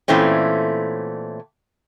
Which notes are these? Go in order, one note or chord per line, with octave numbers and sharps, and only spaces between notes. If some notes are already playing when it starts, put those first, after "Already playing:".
A#2 E3 A3 C4 C#4